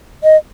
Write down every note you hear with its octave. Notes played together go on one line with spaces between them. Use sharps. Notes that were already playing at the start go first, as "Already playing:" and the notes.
D#5